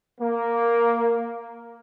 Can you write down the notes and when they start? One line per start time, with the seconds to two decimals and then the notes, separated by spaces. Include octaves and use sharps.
0.20 A#3